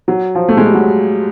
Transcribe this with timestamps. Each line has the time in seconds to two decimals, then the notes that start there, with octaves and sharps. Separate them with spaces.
0.08 F#3
0.35 F3
0.49 A3
0.57 G#3
0.66 G3
0.74 F#3